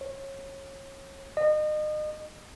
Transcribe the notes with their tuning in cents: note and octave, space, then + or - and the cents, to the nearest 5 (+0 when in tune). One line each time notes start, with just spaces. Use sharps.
C#5 -25
D#5 -35